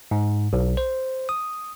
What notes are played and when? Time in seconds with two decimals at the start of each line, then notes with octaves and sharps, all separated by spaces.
0.11 G#2
0.53 B1
0.77 C5
1.29 D#6